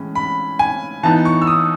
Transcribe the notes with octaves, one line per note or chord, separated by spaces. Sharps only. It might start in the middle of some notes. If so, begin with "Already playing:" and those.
Already playing: A2 E3 G#3 C#4
B5
G#5
E3 B3 D#4 A5
C#6
E6
D#6